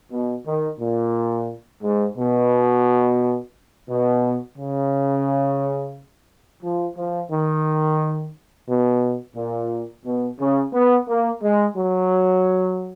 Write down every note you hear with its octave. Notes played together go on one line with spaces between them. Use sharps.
B2
D#3
A#2
G#2
B2
B2
C#3
F3
F3
D#3
B2
A#2
B2
C#3
B3
A#3
G#3
F#3